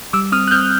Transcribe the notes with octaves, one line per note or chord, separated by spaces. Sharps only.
G3 D6 E6
C4 D#6 F6
F#6
C4 F6 G6